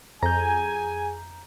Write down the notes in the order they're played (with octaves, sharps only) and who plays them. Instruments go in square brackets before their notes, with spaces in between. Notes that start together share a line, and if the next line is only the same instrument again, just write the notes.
[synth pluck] F2 [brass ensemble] G#4 G#5 [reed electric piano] A#5 G6